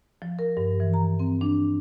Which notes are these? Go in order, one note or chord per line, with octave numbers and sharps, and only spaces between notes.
F3
A#4
G2
E3
A#5
C4
D4